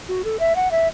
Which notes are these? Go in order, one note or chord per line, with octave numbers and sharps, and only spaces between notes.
F#4
A4
E5
F#5
E5